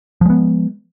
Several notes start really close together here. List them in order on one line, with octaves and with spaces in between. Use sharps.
F3 G#3 B3